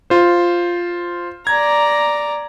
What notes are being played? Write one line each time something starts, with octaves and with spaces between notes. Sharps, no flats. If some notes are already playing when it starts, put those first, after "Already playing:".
F4 C5
D5 A#5 G#6